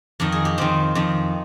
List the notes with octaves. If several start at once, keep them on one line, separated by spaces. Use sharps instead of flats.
F2 D#3 A#4
G#4
G4
F2 D#3 C4
F2 D#3